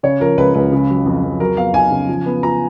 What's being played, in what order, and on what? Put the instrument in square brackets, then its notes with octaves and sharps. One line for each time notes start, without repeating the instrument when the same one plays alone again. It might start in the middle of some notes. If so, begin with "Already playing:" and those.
[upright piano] C#3 [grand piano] C#5
[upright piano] F3 [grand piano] A#4
[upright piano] C#2 [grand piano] B4
[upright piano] C#2 [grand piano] B4
[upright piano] C#3
F#3
F2
F2
[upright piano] F#3 [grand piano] A#4
[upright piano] B3 [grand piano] F5
[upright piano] D#4 [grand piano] G#5
[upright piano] C#3
F3
B3
[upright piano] F4 [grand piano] A#5